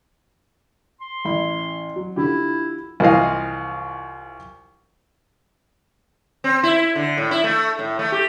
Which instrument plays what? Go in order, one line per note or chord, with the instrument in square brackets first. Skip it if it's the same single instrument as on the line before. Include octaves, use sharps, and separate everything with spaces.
[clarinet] C6
[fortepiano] A1 E4 B5
F#3
[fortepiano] D3 F3 G4 [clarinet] E4
[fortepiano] C2 E3 F3 D#5 F5
[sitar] C4
E4
D3
A2
E4
A3
A2
A3
G4